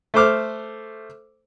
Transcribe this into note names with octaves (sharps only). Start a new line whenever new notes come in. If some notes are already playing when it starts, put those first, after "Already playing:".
A3 C5 D6 F6